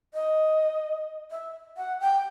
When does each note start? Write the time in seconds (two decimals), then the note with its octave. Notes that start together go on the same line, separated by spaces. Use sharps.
0.14 D#5
1.31 E5
1.77 F#5
2.01 G5